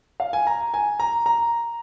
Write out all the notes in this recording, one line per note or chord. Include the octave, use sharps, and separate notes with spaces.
F5
G#5
A#5
G#5
A#5
A#5